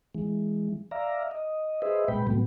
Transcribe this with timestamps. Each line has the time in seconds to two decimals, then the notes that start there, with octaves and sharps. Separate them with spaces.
0.15 E3 G#3
0.91 D5 E5 F5 A#5
1.31 D#5
1.82 G#4 B4 C5 D#5 E5
2.08 A#2 G#3 B4 G5 B5
2.27 A2 C3 F#3 A3 B3